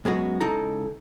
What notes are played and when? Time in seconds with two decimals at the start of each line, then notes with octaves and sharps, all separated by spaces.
0.05 F#2 G#3 B3 F#4
0.40 C#2 D#4 E4 A4 A#5